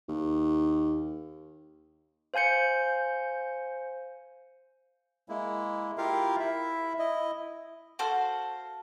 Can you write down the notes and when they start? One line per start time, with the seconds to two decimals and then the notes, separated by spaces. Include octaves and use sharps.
0.09 D#2
2.34 C5 F5 G#5 G6 C#7
5.29 G#3 A#3 E4
5.98 E4 F4 G4 A#4 F5
6.40 E4 E5
6.99 E4 D#5
7.99 F#4 A4 C5 F5